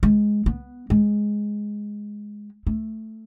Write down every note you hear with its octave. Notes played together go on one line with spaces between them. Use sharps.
G#3
B3
G#3
A3